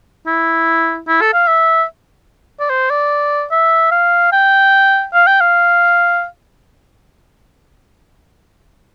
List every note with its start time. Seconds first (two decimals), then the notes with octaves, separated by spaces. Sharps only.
0.26 E4
1.08 E4
1.21 A4
1.34 F5
1.47 E5
2.59 D5
2.70 C5
2.90 D5
3.51 E5
3.91 F5
4.32 G5
5.13 F5
5.27 G5
5.41 F5